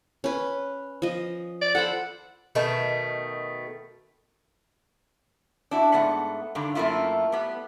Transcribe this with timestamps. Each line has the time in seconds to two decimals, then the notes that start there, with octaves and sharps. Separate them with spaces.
0.24 C#4 B4
1.02 F3 D#5
1.62 D5
1.75 A4 C5 F#5 B5
2.55 B2 D#3 A3
5.71 D4 E4 F#4
5.92 G#2 A3 B3 F#5
6.55 G2 D3 D#3
6.75 F#2 A3 A#3 E4 F4
7.32 G3 B3